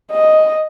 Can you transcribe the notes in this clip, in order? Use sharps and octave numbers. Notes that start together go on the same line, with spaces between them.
D#5